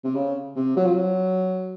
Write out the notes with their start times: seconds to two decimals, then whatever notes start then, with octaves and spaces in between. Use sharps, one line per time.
0.04 C3
0.15 C#3
0.56 C3
0.77 F#3
0.86 F3
0.94 F#3